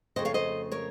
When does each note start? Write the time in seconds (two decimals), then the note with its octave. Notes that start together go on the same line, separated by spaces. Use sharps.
0.16 F2 C#3 A3 C5 D#5
0.25 C#5 F5
0.34 C5 D#5
0.72 A#4 C#5